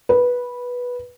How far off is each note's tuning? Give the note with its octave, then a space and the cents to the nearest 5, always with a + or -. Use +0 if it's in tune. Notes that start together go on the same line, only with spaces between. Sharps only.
B4 -10